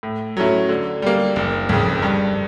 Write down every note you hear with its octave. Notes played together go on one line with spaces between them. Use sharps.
A2
F#3 A3 C#4 E4
D3
G3 A#3
F#1
F2 C#3
G2